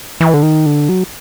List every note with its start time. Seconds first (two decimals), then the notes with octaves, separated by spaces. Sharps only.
0.21 E3
0.34 D3
0.43 D#3
0.66 D3
0.89 F#3